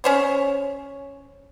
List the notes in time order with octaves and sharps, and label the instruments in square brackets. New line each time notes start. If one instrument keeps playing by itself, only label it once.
[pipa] C#4 C5 C#5